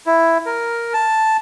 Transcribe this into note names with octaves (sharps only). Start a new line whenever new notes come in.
E4
A#4
A5